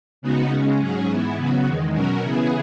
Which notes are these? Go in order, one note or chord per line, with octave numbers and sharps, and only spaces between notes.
C#3 G#3 B3 D#4 F#4
C#3 G#3 C#4
G#2 F#3 C#4 G#4
G#2 E3 B3 E4
C#3 F#3 B3 F#4
E2 D#3 G#3
B2 F#3 C#4 F#4 A#4
C#3 E3 B3 E4 G#4